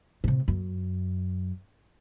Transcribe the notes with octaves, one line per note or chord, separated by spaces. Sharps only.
A2 C3
F#2